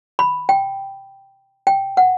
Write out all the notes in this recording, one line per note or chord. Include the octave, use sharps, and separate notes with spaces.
B5
G5
G5
F#5